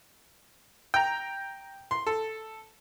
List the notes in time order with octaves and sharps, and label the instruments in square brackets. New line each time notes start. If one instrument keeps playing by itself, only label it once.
[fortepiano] G5 A#5
C6
A4